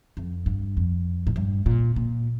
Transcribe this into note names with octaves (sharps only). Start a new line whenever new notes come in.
F2
G2
F2
A2
G2
A#2
A#2